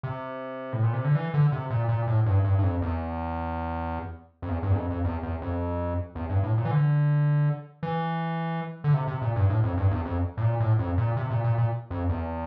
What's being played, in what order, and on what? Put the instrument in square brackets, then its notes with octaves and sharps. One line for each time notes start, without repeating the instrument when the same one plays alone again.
[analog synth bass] C3
A2
A#2
C3
D3
E3
D3
C3
A#2
A#2
A2
G2
G2
G2
F2
E2
F2
E2
G2
E2
F2
F2
E2
E2
F2
E2
G2
A2
A#2
E3
D3
E3
D3
C3
C3
A#2
G2
A2
F2
G2
E2
F2
A2
A#2
A2
F2
A#2
C3
A#2
A#2
A#2
F2
E2